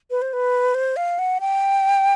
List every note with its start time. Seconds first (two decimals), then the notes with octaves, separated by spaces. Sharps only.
0.10 B4
0.22 C5
0.33 B4
0.74 C5
0.96 F5
1.19 F#5
1.40 G5